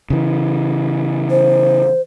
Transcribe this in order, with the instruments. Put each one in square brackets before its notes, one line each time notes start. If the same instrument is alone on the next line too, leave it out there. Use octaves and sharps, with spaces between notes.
[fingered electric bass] C#3 E3
[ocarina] C5